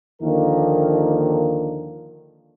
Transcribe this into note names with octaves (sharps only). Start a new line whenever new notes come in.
D#2 D3 D#3 F3 A#3 A#4